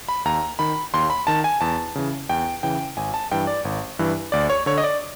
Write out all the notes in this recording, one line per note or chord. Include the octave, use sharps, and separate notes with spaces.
B5
D#2 A#5
D#3 B5
D#2 C6
B5
D#3 A5
G#5
E2 A5
C#3 E3
E2 G5
C#3 E3 G5
G#1 G#5
A5
G2 E3 G5
D5
G#1
G2 E3
D2 D5
C#5
D3 C#5
D#5
D5